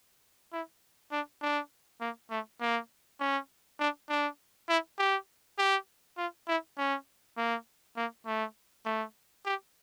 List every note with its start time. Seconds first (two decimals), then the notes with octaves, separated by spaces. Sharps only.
0.52 E4
1.11 D4
1.41 D4
2.01 A#3
2.30 A3
2.60 A#3
3.20 C#4
3.79 D4
4.09 D4
4.69 E4
4.98 G4
5.58 G4
6.17 F4
6.48 E4
6.77 C#4
7.37 A#3
7.96 A#3
8.26 A3
8.85 A3
9.45 G4